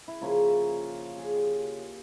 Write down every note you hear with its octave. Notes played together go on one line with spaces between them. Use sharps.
E4
C#3 F3 A#3 C#4 F4
G#4
G4